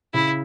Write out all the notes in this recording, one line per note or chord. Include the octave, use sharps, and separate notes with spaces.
C#3 E4